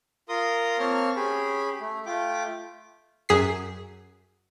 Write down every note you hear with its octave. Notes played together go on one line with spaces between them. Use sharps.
F4 A#4 A#5 C6 D#6
A#3 C4 C#5 A5 F6
C#4 G4 G#4 B5
A3
A3 F4 G5 D6
F#2 G#4 B6 C7